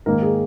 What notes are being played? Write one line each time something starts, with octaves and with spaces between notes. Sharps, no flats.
G#2 D#3 A#3 A#4
G#4